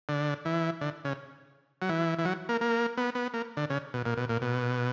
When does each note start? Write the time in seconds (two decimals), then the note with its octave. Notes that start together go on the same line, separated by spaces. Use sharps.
0.09 D3
0.45 E3
0.81 D3
1.05 C#3
1.82 F#3
1.89 E3
2.18 E3
2.25 F#3
2.49 A#3
2.61 A#3
2.97 B3
3.15 B3
3.34 A#3
3.57 D3
3.70 C#3
3.94 B2
4.06 A#2
4.17 B2
4.29 A#2
4.42 B2